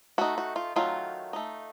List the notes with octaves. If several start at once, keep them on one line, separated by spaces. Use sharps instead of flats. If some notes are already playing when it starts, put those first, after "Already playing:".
A3 D#4 F#4
F#4
F4
D#3 F#3 A3 F4
A3 D#4